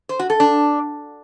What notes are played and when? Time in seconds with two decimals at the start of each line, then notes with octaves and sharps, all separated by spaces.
0.09 C5
0.19 F#4
0.30 A4
0.40 D4